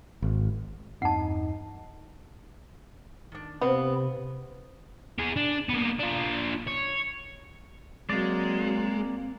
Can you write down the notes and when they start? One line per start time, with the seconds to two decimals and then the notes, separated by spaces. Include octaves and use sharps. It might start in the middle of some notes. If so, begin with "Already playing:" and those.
0.22 G#1
1.02 E2 G2 C4 D#4 F#5 A5
3.32 D#3 D4
3.61 C3 B3 C4 C5 F5
5.18 B3 G#4
5.36 D4
5.69 A#3 B3
6.00 D4 F4
6.67 C#5
8.10 F#3 G#3 A#3 C4 D5